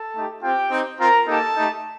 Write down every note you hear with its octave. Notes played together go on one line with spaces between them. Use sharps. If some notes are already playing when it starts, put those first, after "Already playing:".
Already playing: A4 A5
A3 D#4 G4
C4 F4 G4 G5
C4 D#4 G4
C4 F4 A#4 A#5
A#3 D#4 G4 A4 A5
A3 D#4 G4